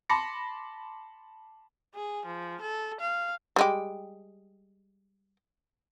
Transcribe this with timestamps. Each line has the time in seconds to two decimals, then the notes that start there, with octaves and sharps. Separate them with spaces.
0.09 A5 B5 C6 D6 A#6 C#7
1.94 G#4
2.26 F3
2.61 A4
3.00 F5
3.56 G3 G#3 G4